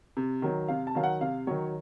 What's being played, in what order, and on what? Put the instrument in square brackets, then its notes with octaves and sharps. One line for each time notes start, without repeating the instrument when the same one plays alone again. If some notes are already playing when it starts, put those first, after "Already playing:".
[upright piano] C3
D#3 F#3
C3 F5
A5
D#3 F#3 F5
F#5
C3 F5
D#3 F#3 C#5